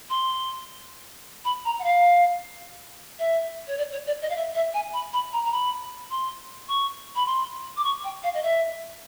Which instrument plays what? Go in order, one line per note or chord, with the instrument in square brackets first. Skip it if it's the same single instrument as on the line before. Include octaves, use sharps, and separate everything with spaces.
[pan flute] C6
B5
A#5
F#5
F5
E5
C#5
D5
C#5
D5
D#5
F5
E5
E5
G#5
B5
B5
A#5
A#5
B5
C6
C#6
B5
C6
D6
C#6
G5
F5
D#5
E5